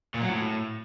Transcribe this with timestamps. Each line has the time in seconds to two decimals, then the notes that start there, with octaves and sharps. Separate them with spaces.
0.14 A#2
0.22 F#3
0.29 A2